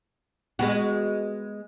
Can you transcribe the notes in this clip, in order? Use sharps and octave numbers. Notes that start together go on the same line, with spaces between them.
G#3 B3 F#4